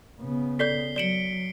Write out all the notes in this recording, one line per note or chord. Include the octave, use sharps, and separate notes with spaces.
C#3 B3
A4 D5 G6 B6 C7 G7
F#3 D5 C#7 D7 E7 F#7 G7